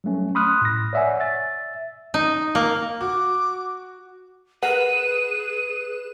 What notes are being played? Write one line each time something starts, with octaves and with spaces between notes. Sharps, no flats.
F#3 G3 A3 C#4
B5 C6 D#6 F6 F#6
A2 A#6
C#5 D5 E5 F#5 G#5
E5 A6
D#4
A#3
F#4 D6
G#4 A#4 B4 F#5 F#6 D#7 E7